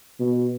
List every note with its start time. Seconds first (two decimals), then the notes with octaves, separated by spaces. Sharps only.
0.20 B2